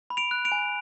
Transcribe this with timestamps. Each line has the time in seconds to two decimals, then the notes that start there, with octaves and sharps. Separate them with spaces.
0.10 B5
0.17 D7 F7
0.31 F#6
0.45 D7 F7
0.52 G#5